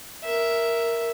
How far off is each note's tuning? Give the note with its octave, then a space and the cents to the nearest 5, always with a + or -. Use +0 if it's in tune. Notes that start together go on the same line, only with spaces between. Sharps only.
A#4 +0 E5 +0